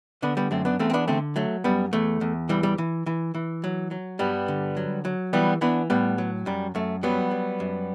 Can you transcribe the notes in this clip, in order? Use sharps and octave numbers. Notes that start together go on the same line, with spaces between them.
D3 B3 D4
G3 B3
F#2 A3 C4
B3 D4
E2 A3 C4
C4
B3 D4
D3 A3 C4
F#3 A3
F#2 G3 B3
E2 A3
E2
E3 G3
G3
E3
E3
E3
F#3
F#3
G2 G3 B3
D3
F#3
F#3
E3 G3 B3
E3 B3 D4
A2 G3 B3
F#3
F#2 G3
F#2 A3
F#3 G3 B3
F#3
F#2